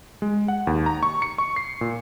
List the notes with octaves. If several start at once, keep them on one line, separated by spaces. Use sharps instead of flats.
G#3
F#5
D#2
A#5
C#6
C#7
C#6
C7
A#2